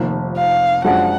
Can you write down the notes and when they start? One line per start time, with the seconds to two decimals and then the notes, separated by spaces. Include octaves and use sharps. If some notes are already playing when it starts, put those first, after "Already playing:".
Already playing: F1 F2 D#3 A#3
0.36 F5
0.84 F#2 F3 G#3 D4 F#4 F#5